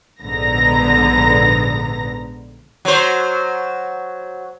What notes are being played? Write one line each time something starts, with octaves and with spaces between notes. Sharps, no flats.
A#1 G#2 D3 B3 A#5 A#6
F#3 C5